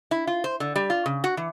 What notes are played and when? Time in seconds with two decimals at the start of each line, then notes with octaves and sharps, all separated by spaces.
0.11 E4
0.27 F4
0.44 C5
0.60 D3
0.76 G3
0.90 F4
1.06 C#3
1.24 F#4
1.37 E3